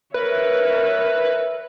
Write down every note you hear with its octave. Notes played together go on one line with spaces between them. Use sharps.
A#4 B4 C#5 E5